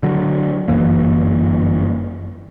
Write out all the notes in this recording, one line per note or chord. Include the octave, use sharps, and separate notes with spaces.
D3 F#3
G1 F#2 E3 A#3